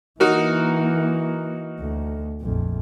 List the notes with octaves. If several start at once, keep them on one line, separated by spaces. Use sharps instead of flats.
E3 A#3 D#4 F#4 A#4
D2
A#1 F2